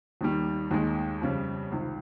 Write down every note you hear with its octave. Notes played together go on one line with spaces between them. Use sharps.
D#2 D#3 G3
D#2 D#3 G#3
F2 C#3 G3
C#2 C3 D#3